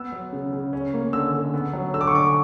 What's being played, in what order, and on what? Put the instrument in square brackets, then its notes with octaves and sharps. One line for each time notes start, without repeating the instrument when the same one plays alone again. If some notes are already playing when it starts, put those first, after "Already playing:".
Already playing: [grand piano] B3 E6
F#3
C#3
C#3
C#4
A#3
D3 E6
D3
B3
F#3
D3 E6
D6
C#6
D3 D6